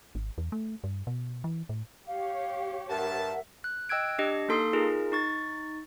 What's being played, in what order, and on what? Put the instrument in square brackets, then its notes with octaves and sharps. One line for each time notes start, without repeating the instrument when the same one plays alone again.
[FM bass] G#1
E2
A3
G2
B2
E3
A2
[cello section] G4 C#5 [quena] F5
[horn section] G2 A5 [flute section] A#4 F#5 [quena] E5
[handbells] F#6
D#5 G5 E6 F#6 G#6 D7
D4 G4 D#5 C#7
A#3 D#4 A4 C6 D#6 C7
D#4 F4 G#4 A#4
D#4 C#6 A6